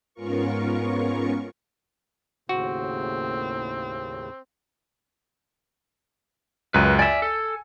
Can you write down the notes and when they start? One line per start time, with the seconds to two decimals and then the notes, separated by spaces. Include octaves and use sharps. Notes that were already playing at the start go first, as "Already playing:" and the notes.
0.14 G#2 B3 C#4 F4 A#4 C#6
2.49 D#2 A2 C#3 C4 F#4
6.74 C#2 F#2 B4
6.99 D5 E5 G#5
7.22 A4